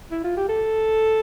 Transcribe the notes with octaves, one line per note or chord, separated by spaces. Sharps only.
E4
F4
G4
A4